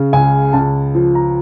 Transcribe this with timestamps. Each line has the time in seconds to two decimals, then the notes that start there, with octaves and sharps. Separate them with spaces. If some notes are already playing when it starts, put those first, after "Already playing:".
Already playing: C#3
0.13 C#2 G#5
0.53 C#2 A5
0.95 F3
1.15 A#5